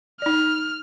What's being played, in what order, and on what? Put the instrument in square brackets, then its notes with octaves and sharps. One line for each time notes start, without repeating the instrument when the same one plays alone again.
[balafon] D#4 D5 [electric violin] F6